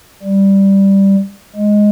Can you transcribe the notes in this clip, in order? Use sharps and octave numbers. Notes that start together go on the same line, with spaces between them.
G3
G#3